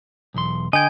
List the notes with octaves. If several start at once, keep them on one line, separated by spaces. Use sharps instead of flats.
B1 E2 C6
D3 D#5 G5 G#5 G#6